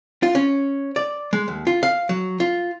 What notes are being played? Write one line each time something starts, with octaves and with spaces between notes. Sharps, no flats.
F4
C#4
D5
G#3
D#2
F4
F5
F#3
F4